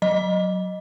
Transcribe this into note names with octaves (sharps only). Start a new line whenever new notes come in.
F#3 D#5